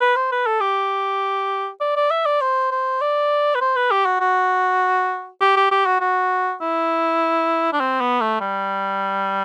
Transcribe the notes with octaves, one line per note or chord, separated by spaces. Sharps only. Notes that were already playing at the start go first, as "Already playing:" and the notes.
B4
C5
B4
A4
G4
D5
D5
E5
D5
C5
C5
D5
B4
C5
B4
G4
F#4
F#4
G4
G4
G4
F#4
F#4
E4
D4
C4
B3
A3
G3